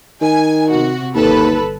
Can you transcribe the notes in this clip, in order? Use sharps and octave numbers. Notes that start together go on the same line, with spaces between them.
D#3 G#5
C3 F#4
G1 D#2 A4 B4